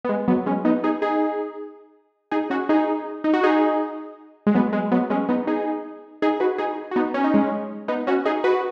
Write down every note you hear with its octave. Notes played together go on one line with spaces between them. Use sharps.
B3
G#3
F#3 B3
G#3 C#4
B3 D#4
D#4 G#4
D#4 G#4
D#4 G#4
C#4 F#4
D#4 G#4
D#4
F#4
D#4 G#4
G#3
F#3 B3
G#3
F#3 B3
G#3 C#4
B3 D#4
D#4 G#4
D#4 G#4
F#4 B4
D#4 G#4
F#4
B3 D#4
C#4
D#4
G#3 C#4
B3 D#4
C#4 F#4
D#4 G#4
F#4 B4